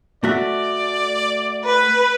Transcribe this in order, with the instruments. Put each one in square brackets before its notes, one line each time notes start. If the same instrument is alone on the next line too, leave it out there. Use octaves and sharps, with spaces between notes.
[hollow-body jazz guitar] A3 F#4 E5 [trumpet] D5
[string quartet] B4